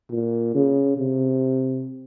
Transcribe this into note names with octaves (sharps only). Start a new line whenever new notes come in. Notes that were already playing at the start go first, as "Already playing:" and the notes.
A#2
C#3
C3